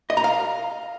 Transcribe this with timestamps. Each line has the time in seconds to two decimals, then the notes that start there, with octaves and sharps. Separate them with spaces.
0.10 D#5
0.17 A#5
0.24 F5